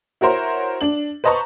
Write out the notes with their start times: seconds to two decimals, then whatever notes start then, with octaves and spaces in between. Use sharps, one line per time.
0.21 E4 F#4 A#4 C5 C#5
0.81 D4 F#7
1.24 B4 C5 D#5 A5 A#5 C#6